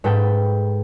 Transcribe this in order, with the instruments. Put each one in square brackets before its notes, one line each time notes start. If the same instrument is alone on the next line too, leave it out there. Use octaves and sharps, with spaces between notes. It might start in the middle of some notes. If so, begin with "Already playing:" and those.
[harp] G#2 A4 B4 G5